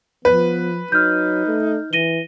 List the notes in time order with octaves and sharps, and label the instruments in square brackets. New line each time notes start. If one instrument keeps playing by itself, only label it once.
[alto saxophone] F3 [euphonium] B3 [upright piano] B4
[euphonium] F#3 [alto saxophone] D#4 [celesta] F6 G6
[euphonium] A3
[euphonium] E3 [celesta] A#6 D#7 G7